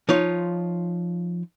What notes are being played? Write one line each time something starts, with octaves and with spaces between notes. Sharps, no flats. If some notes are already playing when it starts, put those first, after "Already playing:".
F3 D#4 F4 C#5